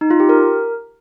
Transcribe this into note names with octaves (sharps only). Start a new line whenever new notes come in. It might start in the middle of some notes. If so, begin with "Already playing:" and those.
D#4
F4
G4
A#4